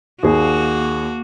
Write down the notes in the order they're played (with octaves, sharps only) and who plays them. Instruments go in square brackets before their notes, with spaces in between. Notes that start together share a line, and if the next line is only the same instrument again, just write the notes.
[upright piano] D#2 G#4 [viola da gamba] A#3 F#4